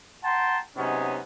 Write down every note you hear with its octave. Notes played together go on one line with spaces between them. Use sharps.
F#5 G5 A5 A#5 C6
C3 F#3 G#3 B3 C#4 D#4